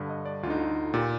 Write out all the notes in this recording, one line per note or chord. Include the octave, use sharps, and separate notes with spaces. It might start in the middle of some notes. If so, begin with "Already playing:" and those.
Already playing: G2 D3
D#5
D5
D2 D3 D#4 F4
F4
A#2 G4